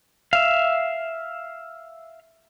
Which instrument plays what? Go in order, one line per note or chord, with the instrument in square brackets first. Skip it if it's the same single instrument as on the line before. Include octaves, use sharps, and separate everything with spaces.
[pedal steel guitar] E5 F5